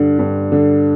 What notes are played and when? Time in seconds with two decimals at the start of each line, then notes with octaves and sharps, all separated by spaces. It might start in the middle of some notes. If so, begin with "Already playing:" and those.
Already playing: G2 D3
0.19 G2
0.52 D3